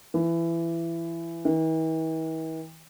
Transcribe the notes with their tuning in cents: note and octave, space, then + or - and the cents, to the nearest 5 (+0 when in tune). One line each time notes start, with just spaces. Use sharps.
E3 +20
E3 -45